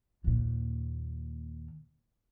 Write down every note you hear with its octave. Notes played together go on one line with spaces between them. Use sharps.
D#2 A#2